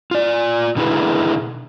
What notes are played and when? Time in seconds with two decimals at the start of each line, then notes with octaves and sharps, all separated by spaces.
0.11 F4 D5
0.76 B2 D3 D#3 E4 G#4 B4